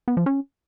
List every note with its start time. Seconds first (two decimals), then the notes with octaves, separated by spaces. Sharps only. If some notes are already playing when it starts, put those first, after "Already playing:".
0.08 B3
0.17 F3
0.26 C#4